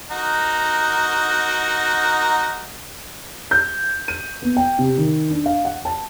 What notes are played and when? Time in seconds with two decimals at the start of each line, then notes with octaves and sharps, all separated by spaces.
0.11 D#4 F#4 A#4
3.51 G6
4.08 D#7
4.42 B3
4.57 G5
4.79 C3
4.97 D#3
5.30 D4
5.46 F5
5.65 F#5
5.85 A5